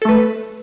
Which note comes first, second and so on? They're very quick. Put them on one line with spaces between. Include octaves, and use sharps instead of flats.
A4 A3 B4